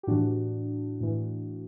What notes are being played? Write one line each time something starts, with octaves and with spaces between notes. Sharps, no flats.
G4
A2 E3 D4 F#4
A2 E3